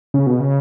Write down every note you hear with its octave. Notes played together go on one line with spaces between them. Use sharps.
C#3
B2
C#3